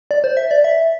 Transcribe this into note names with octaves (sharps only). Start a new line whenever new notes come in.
D5
C5
E5
D5
E5